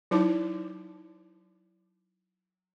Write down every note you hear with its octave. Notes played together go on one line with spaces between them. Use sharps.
F#3 D#4 E4 C5 A5 D6